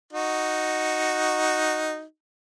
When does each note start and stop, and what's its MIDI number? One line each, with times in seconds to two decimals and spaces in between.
0.13 2.02 63
0.13 2.02 66